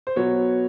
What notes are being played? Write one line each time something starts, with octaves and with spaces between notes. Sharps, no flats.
C5
B2 F#3 B3 C#5